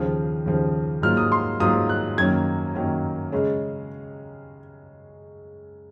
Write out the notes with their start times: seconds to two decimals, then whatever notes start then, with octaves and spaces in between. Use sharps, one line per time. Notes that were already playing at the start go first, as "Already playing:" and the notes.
Already playing: D#2 C#3 F3
0.46 D#2 C#3 F3
1.02 G#2 F#3 A#3 F4 F6
1.17 D#6
1.32 C6
1.60 G#2 F#3 A#3 F4 D#6
1.89 F#6
2.17 F#2 D#3 F#3 A#3 C#4 G#6
2.75 F#2 D#3 F#3 A#3 C#4
3.32 C#3 G#3 C#4